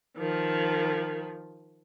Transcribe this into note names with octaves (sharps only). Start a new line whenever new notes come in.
D#3 F3